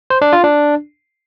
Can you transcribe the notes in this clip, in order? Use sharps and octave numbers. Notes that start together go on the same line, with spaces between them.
C5
D4
F4
D4